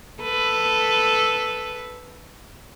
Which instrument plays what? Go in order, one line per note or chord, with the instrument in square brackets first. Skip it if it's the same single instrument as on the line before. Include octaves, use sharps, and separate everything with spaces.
[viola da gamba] A4 B4